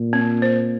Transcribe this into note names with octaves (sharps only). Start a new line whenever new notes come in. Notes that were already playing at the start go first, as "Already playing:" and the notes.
Already playing: A#2
C4
C5